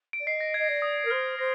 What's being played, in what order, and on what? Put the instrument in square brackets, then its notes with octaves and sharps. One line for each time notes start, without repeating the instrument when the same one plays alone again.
[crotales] D7
[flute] D5
[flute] D#5 [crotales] C7
[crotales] A#6
G#6
[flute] D#5
D5
[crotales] D#6
[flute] A#4
[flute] C5 [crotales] F6
[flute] C5 [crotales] A#6